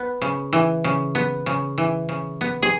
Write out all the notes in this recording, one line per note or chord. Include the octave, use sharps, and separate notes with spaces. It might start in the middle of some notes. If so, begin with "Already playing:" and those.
Already playing: B3
C#3
E3
C#3
B3
C#3
E3
C#3
B3
G#4